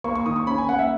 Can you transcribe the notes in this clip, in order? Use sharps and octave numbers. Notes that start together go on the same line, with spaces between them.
A#3 C#6
C#6
D#3 D#6
C#6
C#4 B5
G#5
A#3 F#5
E5